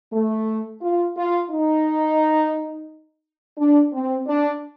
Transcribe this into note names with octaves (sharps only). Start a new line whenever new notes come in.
A3
F4
F4
D#4
D4
C4
D4